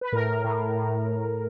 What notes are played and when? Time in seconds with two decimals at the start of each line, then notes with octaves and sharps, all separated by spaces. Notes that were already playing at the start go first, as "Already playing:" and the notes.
0.01 B4
0.12 A2 A#4
0.44 A2
0.75 A2